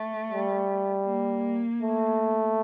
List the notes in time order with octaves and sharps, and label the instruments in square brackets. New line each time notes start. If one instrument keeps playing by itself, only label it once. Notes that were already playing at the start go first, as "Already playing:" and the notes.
Already playing: [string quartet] A3
[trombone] G3
[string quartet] A#3
[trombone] A3